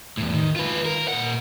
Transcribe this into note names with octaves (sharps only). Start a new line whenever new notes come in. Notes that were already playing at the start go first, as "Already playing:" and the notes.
E2 A2
D#3
F4 B4
A#4
A#2 F#5